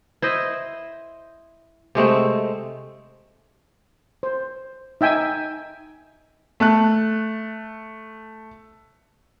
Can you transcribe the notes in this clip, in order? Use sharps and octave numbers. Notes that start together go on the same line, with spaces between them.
E4 C5 D#5
C3 G#3 A3 C4
C5
D#4 E5 G5 G#5
A3 A5 F#6